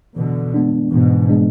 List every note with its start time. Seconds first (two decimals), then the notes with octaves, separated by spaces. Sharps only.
0.16 B2 D3 E3
0.54 G#3 B3 D4
0.92 G#2 B2 E3
1.29 G#3 B3 D4